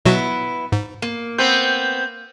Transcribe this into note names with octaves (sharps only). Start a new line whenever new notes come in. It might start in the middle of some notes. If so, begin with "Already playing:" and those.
B2 F#3 B3 E4 F#4
G#2
A#3
B3 C4 G6